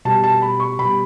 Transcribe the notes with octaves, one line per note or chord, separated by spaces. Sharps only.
B2 G3 A5
A5
B5
C#6
B2 G3 B5